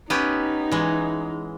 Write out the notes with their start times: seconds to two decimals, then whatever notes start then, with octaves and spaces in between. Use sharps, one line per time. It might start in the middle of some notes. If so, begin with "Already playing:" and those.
0.10 B3 C#4 D#4 G4
0.72 E3 G#3